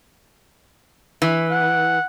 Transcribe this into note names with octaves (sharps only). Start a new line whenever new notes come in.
E3
F#5